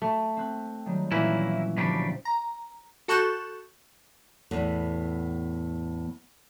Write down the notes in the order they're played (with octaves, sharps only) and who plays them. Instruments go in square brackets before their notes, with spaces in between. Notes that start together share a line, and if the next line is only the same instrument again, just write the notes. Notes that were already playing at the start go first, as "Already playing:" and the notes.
[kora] A3
[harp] C4 F#6
D#3 F#3 G3
[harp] A#2 C#4 [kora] E3 [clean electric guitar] A#3 E4
[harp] G1 F3 [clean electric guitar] B2 G3 D4
[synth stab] A#5
F#4 A4 C#6 F#6 G6 E7
[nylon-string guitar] E2 A2 B3